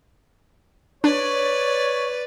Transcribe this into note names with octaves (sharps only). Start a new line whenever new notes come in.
D4 B4 C#5 D5